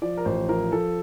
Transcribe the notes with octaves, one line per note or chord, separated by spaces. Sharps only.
F3 D5
A#4
A1 C5
F3 A#4
F3 A4